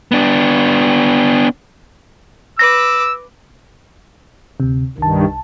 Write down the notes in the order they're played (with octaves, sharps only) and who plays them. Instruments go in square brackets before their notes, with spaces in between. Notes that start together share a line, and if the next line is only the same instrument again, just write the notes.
[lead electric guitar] B3 D4
[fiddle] B4 D6 [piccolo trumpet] E6 [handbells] A#6
[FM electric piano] D2 C3
[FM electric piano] C2 A5 [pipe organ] G2 D#3